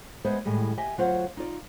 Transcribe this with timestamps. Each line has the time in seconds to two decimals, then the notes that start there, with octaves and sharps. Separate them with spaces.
0.25 G#3 B3 C5 E5
0.45 A2 D#3 G3 G#3
0.77 G4 D#5 E5 G#5
0.97 D2 F#3 F4 C5 F#5
1.37 D#4 F4 D5